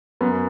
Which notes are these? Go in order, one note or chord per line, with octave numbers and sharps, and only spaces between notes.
F#2 B3